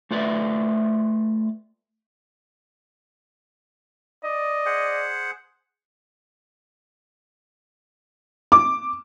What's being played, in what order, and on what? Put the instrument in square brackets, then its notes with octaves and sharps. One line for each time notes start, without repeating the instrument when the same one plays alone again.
[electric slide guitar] A3 F4 B4 D5 E5
[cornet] D5 [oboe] D#5
[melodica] G#4 C5 F#5
[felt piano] D6